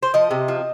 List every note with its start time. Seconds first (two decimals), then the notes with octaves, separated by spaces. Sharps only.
0.03 C5
0.14 F3 D#5
0.31 C3
0.48 F3